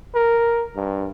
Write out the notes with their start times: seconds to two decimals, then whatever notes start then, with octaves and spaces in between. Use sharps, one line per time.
0.15 A#4
0.76 G2